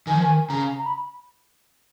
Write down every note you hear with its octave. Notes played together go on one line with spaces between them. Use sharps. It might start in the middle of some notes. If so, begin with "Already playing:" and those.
D#3 G#5
F3
D#3
C#3 A#5
B5